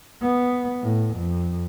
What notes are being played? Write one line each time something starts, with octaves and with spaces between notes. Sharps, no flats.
B3
A2
F2